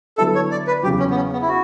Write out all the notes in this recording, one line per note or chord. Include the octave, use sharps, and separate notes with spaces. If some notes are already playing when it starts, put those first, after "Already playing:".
D3 F#3 B3 E4 A4
C#5
D5
B4
E2 C#3 F#3 G4
C#4
B3
C#4
B3
E4
F#4